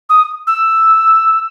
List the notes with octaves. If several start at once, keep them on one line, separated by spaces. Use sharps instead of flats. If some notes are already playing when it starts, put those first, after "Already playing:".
D#6
E6